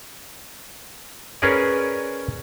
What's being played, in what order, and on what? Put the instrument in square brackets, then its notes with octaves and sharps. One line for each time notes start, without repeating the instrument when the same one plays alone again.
[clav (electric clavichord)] C#4 G#4 A#4 B4 C#5 D5